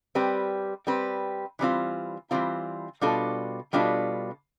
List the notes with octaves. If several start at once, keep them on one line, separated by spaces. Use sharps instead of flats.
G3 C4 G4 B4
G3 C4 G4 B4
E3 G3 C4 F4
E3 G3 C4 F4
B2 G3 D4 F4 A4
B2 G3 D4 F4 A4